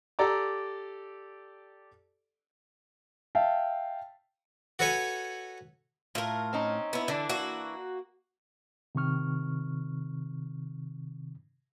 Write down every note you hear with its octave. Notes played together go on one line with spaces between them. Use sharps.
G4 A4 D5 A#5 D6
E5 F5 G5 A5
F#4 A4 B4 C#5 G#5
A2 F4 A#4
C4 C#4 D#4
B3 E4
D3 E3 D4 E4
A#3 F#4
C3 D#3 C4 C#6 F6